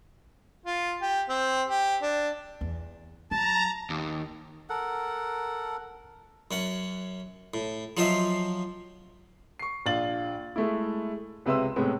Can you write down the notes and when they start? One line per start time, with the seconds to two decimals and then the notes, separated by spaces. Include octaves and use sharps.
0.66 F4
1.02 G4
1.29 C4
1.68 G4
2.02 D4
2.61 E2
3.31 F#3 A5 A#5
3.90 D#2
4.70 A4 A#4 F#5
6.51 F#2 C#4 F#5
7.54 A2
7.97 F3 F#3 F4 C5 D#5 E5
9.59 C#6 C7
9.86 A#1 D4 F4 A6 F#7
10.56 G#3 A3 E4
11.46 C#2 C3 B4 E5 C6 E6
11.76 A2 C3 G#3 B3